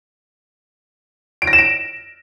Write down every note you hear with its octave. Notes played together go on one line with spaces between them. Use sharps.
D7
A#6
E7
D7